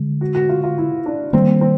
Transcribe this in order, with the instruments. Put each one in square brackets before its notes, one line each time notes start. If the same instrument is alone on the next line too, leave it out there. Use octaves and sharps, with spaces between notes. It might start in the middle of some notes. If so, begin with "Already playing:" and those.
Already playing: [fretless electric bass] D3 G#3
[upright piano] F#4
F#4
F4
F4
E4
D4
[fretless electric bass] D#3 G3 A#3 [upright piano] C4
[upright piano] C4